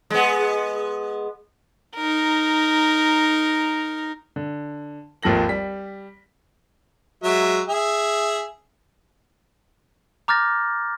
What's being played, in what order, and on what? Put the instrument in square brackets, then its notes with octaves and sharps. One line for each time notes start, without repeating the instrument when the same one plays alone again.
[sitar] G#3 B3
[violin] D#4 A#4
[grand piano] D3
G#1 D#2 F3 A4 A#6 F#7
G3 B6
[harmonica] F#3 G#3 E5
G#4 E5
[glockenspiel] A#5 D6 F6 G6 A6 A#6